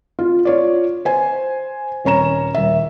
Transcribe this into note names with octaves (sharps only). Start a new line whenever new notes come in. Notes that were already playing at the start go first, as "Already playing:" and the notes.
F4
F4 C#5 D5
C5 G#5
D#1 C#4 C#5 A#5 E7
D#1 E5